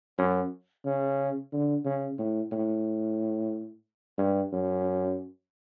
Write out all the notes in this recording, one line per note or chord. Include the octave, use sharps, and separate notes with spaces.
F#2
C#3
D3
C#3
A2
A2
G2
F#2